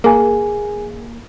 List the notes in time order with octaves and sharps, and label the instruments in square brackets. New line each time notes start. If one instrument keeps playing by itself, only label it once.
[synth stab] A#3 [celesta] G#4 G#5